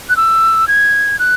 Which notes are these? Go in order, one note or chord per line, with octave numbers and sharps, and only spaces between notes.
F#6
E6
G#6
F#6